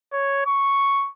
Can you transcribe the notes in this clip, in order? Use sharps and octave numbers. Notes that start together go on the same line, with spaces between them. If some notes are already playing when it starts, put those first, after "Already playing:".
C#5
C#6